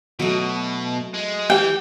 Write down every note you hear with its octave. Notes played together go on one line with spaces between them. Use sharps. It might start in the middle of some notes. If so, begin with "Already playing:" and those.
B2 F#3 A3
G#3
E3 G4 G5